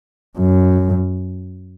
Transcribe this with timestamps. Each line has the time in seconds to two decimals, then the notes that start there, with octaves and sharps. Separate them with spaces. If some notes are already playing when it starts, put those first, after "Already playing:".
0.38 F#2